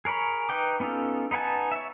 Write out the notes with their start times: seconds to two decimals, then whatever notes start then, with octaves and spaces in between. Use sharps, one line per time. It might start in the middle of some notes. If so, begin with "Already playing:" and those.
0.05 G#4 A#4 C#5 B5
0.49 D#4 B4 G5 D6
0.80 B3 C#4 D#4 F4 A4
1.31 D#4 B4 F#5 G#5 A5
1.72 C#5 E5